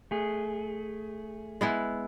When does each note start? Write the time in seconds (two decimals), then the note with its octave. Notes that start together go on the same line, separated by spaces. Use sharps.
0.11 A3 G#4
1.61 G#3 B3 E4